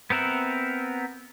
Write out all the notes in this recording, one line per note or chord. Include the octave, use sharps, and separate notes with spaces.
B3 C4 A#4 E5 F#5